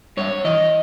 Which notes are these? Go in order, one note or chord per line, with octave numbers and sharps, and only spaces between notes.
G2 C#5
E3 D#5